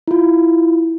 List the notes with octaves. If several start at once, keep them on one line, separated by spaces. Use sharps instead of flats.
E4 F4